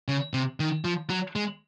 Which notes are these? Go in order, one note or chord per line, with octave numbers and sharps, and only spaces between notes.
C#3
C3
D#3
F3
F#3
G#3